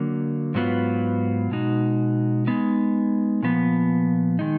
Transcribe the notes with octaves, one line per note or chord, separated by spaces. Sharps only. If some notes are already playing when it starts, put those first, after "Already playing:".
Already playing: D3 F#3 A#3
G#2 F#3 B3 F4 B4
B2 G#3 D#4 F#4
G#3 B3 D#4
A#2 F3 B3
D#3 G#3 D#4